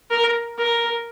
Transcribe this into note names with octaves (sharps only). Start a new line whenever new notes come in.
A#4
A#4